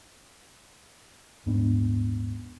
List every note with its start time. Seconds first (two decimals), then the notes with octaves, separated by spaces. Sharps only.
1.46 D#1 G#2 B3 D4